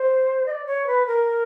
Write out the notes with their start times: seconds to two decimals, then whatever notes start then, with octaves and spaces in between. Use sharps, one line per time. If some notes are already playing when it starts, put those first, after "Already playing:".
Already playing: C5
0.46 D#5
0.51 D5
0.66 C#5
0.87 B4
1.06 A#4